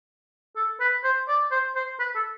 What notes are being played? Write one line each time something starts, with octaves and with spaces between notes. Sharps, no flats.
A4
B4
C5
D5
C5
C5
B4
A4